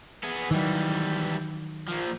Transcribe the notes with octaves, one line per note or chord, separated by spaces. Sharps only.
B3 G#4
D#3 E3 F#3 G3
A#2 F3